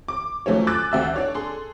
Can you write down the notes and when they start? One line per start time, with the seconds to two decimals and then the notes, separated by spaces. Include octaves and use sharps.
0.08 D6
0.46 F3 F#3 A3 C#4 C#5
0.67 G#5 D6 E6 F#6 A6
0.92 D2 E5 E6
1.14 D4 C#5 D5
1.35 G#4 A4 C6